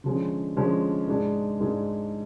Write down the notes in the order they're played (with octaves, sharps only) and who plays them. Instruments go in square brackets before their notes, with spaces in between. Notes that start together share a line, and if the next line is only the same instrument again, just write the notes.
[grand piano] D3 F3 G#3 C#4
D3 F3 G#3 C#4
G#2 G#3 D4
G#2 G#3 D4